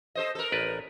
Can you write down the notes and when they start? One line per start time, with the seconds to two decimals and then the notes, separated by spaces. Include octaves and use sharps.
0.15 A4 C5 D#5
0.35 A4 A#4
0.52 A1 B4 D5